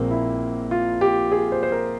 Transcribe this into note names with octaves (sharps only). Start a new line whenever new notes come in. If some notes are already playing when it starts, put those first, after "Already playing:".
Already playing: A#1 A#2 G#3 A#3 C4
E4
F4
G4
G#4
C5
C5
A#4